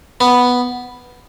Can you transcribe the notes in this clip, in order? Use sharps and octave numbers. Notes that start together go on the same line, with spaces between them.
B3